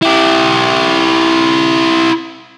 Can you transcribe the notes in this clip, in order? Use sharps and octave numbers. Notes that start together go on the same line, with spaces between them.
E4 G4